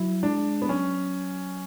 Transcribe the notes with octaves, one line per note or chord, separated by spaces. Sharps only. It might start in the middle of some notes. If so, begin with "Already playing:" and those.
Already playing: F#3 E4
G#3 D4
B3
F#3 C#4